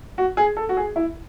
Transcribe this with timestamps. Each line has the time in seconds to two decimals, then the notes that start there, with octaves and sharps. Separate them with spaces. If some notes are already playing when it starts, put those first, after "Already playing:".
0.18 F#4
0.37 G#4
0.57 A4
0.69 F#4
0.77 G#4
0.96 E4